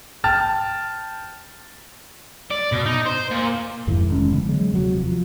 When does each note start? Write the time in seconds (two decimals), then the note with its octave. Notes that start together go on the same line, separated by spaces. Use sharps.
0.24 G5 A5 F6 A6
2.51 D5
2.72 B2
2.85 D#4
3.06 C5
3.31 A#2
3.87 F2 G#2 D#3 E3
4.09 F1 G#3 C#4
4.32 C#3 E3 G#3 B3
4.48 D3 F#3 G#3
4.71 E1 D#2 C3 F#3
4.97 F3